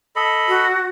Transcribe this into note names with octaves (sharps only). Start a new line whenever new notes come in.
A4 D#5 B5
F#4